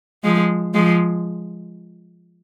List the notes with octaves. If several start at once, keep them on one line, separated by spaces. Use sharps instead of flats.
F3 G#3
F3 G#3